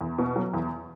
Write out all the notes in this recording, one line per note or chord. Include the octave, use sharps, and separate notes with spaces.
E2
B2
F#3
E2